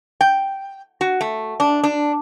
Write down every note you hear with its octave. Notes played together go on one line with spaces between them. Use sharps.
G5
F#4
A3
D4
D4